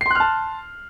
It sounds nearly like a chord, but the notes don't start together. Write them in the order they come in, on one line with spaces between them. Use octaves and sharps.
C7 C6 F#6 F6 A5